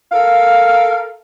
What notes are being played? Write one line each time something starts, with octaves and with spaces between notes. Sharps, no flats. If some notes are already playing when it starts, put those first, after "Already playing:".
A4 A#4 F5